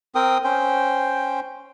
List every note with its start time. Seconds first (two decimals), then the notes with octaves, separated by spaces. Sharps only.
0.15 C4 A#4 G5 D#6
0.44 C#4 C5 G5